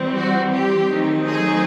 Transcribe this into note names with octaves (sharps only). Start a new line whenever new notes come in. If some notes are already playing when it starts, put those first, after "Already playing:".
Already playing: E3 G3 C4
F#4
G4
D#3 F#3 A3 C4 D#4
G#4